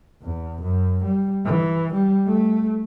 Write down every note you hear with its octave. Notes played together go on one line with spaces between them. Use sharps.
E2
F#2
G3
E3
G3
A3